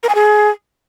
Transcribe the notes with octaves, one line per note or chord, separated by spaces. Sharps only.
A#4
G#5
G#4